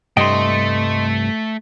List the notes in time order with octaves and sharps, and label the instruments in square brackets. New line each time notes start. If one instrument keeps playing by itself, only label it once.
[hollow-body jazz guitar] C2 G2 G5 [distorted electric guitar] A3 [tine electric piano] D#5 C6